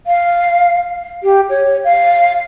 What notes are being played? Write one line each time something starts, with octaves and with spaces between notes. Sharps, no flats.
F5
G4
C#5
F5